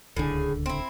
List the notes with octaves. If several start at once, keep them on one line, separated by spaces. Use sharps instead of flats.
D1 C#2 A2 D3 G#4
C4 E4